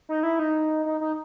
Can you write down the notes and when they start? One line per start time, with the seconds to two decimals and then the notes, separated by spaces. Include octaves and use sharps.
0.09 D#4
0.23 E4
0.39 D#4
0.86 D#4
1.01 D#4